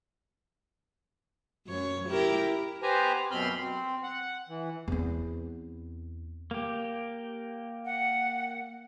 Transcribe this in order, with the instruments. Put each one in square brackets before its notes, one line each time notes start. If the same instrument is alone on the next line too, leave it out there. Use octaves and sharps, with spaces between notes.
[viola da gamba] F#2 C#5
E4 G4 A#4
[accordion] B3 G4 B4 C5 G#5 A#5
F#2 B2 C4 B5 C6 F6
C4
F#5
E3
[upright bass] E2 C4
[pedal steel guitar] A#3 G4
[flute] F#5